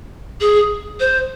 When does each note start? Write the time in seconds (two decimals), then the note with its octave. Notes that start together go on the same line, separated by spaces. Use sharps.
0.41 G#4
1.00 C5